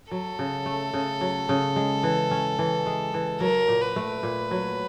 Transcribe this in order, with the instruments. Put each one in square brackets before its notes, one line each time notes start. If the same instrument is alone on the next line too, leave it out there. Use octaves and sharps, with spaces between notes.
[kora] F#3 [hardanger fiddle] A4
[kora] C#3
A3
C#3
F#3
C#3
G#3
E3
C#4
E3
G#3
E3
[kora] F#3 [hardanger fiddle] A#4
[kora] A#2
[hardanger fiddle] B4
[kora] A3
A#2
F#3